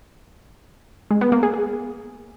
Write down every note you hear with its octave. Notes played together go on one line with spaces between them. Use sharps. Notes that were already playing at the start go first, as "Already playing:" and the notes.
G#3
B3
A#3
G#4
G#4